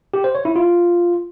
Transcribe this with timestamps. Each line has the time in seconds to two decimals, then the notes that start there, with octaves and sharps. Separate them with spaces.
0.14 G4
0.24 C5
0.35 C#5
0.45 E4
0.56 F4